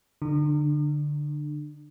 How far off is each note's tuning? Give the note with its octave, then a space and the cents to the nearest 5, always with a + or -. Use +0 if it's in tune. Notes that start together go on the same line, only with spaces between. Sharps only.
D3 +0 D4 +35